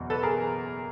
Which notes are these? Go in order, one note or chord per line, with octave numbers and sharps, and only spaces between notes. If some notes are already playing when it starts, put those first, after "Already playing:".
Already playing: F#1 E2 B2
A4 B4
G#4 A#4